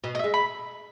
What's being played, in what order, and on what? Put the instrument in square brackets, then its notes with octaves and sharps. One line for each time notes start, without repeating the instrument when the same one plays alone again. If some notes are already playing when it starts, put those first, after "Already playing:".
[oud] B2 [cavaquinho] D#5
[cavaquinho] D#5
[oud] G#3 [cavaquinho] E5
[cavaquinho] B5